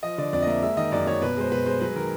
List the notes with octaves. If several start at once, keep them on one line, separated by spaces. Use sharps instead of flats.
F3 D#5
D3 D5
F2 D5
D#5
A#3 E5
G#3 E5
D#3 D#5
F#2 D5
F#2 C#5
B2 B4
G#3 C5
B2 B4
G#3 C5
F#3 B4
D#3 A#4